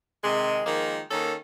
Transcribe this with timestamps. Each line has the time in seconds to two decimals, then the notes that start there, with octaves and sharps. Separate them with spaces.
0.23 C3 D#3 G#3
0.65 D#3 F3 G#3 A#3
1.11 D#3 A#3 C#4 A4